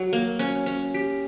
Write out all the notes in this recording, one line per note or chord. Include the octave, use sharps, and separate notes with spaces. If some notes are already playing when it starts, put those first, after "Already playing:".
Already playing: F#3
A#3
C#4
C#4
G4